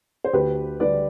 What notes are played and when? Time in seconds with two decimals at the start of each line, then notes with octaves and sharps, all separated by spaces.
0.24 C5
0.33 D2 G4 B4
0.80 D3 G3 B4 D5